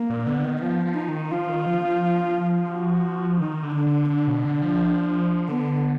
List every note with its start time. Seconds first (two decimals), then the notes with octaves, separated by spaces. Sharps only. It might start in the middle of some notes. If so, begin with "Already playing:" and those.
Already playing: A#3
0.10 A#2
0.27 D3 B3
0.44 D#3
0.62 F3 B3
0.85 F3
0.97 D#4
1.08 D#3
1.31 F3 F4
1.49 D#3
1.66 F3
1.84 F3
2.70 F#4
3.40 D#3 D#4
3.63 D3
3.75 D4
3.86 D3
4.10 D3 D4
4.27 B2
4.45 D3
4.62 F3
5.48 D3 B3